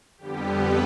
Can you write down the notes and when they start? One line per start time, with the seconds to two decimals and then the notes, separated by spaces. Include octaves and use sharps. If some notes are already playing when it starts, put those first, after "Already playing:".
0.18 F2 D3 G3 B3 G4
0.48 B4